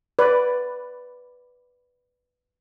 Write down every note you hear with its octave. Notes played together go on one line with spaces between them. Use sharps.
B4 D5